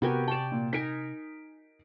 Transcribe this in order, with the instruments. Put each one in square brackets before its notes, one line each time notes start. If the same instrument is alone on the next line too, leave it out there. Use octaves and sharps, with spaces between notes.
[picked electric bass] C3 [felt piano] B3 A#4 [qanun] F#4 G4 G#5
[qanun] D5 G5 [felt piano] A5 C#6 E7
[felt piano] A#2
[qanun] D#4 A#4 G#5 [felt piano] B6 D7